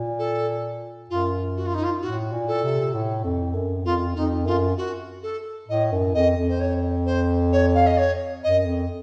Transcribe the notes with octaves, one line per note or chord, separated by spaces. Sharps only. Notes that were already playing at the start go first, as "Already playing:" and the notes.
Already playing: A#2
A4
F#2 F4
F#4
F4
D#4
F4
A2 F#4
A#2
A4
C3
A2
F2
F#2
F2 F4
F2 D#4
F#2 F4
F#4
A4
A2 D#5
F#2
F2 D#5
F2
C5
C#5
C5
C#5
F5
D#5
C#5
F#2 D#5
F2